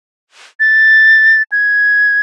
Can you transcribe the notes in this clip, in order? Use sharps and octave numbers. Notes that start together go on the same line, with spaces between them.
A6
G#6